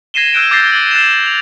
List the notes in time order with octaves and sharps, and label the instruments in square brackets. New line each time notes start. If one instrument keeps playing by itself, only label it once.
[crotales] G#6 A#6 C7 D#7 E7 G7
E6 F#6 G6 D7 E7
D6 G6 A6 A#6 C7
F#7
F#6 A6 E7
F7